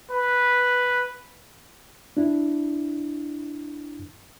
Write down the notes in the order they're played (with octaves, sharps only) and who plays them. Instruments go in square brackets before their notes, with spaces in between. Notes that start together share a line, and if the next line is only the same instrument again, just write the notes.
[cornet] B4
[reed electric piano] D4 E4